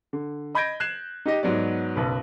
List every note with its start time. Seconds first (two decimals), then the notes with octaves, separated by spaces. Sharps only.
0.13 D3
0.55 D#5 B5 G6 G#6 A#6 D7
0.80 F#6 G#6 C7 E7
1.26 D#4 G4 D#5
1.43 G#2 F#3 B3 D5
1.96 F#1 B1 B4